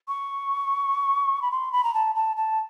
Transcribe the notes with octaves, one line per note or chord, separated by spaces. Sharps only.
C#6
B5
C6
B5
A#5
A5
A5
A5